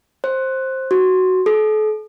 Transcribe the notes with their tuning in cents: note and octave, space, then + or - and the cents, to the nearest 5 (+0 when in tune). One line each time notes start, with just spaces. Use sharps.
C5 +10
F#4 +10
A4 -40